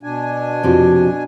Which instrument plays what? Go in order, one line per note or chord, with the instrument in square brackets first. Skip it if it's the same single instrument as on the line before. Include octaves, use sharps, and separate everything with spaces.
[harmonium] B2 D4 G#5
[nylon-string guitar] F2 C3 F3 [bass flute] F#4